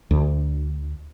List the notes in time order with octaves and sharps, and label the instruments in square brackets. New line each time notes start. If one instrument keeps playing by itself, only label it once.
[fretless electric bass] D2